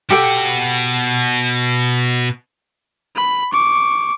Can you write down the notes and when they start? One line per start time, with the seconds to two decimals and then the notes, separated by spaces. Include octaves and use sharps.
0.10 B2 G4 A4 F#5 G5
3.16 B5
3.53 C#6 D6